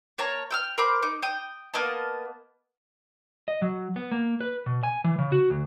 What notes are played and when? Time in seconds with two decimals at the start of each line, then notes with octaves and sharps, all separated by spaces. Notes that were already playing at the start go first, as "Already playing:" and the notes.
0.18 A#3 C#5 A5 A#5
0.51 G5 E6 F6
0.78 A#4 C5 B5 D6
1.02 D#4 D6
1.22 G5 D#6
1.74 A#3 B3 D#5 A5
3.48 D#5
3.62 F#3
3.96 B3
4.12 A#3
4.41 B4
4.66 B2
4.83 G#5
5.04 E3
5.19 C#3
5.32 F#4
5.50 D2